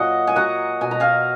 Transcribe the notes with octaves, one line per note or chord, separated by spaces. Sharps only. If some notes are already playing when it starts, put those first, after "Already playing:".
Already playing: A#2 F#3 D#5 F#5 G#5
G#5
F#3 F#5 A#5
B2 G#5
A#5
F5 G#5